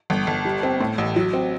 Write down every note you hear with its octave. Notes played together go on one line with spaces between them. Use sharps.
G1
G1
G3
C4
A2
A1
F#3
C4